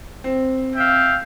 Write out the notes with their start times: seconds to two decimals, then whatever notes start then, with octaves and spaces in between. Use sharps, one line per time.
0.24 C4
0.76 E5 F5 G5